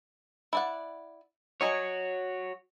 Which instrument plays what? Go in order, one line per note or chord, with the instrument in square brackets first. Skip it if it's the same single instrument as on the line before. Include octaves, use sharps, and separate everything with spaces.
[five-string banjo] E4 D5 F#5
[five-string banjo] F#3 D#5 G#5 [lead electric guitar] F#4 C#5